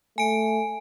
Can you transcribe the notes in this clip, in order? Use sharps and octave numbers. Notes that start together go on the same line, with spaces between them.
A3 G#5 D7